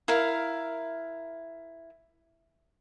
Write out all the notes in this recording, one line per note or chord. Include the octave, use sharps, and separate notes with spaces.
E4 A#4 F5